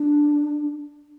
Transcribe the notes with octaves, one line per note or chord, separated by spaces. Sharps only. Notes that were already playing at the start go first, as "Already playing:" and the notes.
Already playing: D4